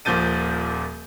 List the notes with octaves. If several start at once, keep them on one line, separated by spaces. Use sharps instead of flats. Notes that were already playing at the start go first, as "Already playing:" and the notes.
D#1 A#2 F3 G6 A6 D#7